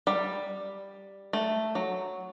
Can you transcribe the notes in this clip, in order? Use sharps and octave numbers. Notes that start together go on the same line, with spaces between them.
G3
A3
F#3